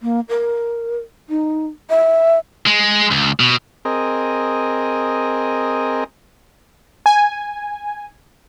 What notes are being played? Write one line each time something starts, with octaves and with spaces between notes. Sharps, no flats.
A#3
A#4
D#4
E5
G#3
C#2
B2
C4 G#4 A#4 D#5
G#5